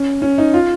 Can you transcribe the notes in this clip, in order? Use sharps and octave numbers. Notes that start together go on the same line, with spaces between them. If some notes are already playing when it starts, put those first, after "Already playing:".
Already playing: C#4
C#4
D#4
F4